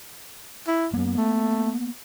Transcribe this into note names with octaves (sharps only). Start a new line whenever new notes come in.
E4
F#2 A#3 B3
A3